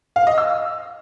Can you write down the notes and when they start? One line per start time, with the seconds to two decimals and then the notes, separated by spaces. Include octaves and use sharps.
0.16 F5
0.27 D#5
0.38 E6